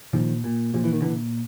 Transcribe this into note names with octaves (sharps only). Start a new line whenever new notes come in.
A#2 D#3 F3
A#2
A#2 F3
E3
D#3
A#2 D3 E3